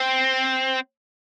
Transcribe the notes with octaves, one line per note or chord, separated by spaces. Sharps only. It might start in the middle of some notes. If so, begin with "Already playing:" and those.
Already playing: C4